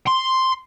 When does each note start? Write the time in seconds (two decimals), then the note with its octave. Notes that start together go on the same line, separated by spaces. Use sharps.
0.07 C6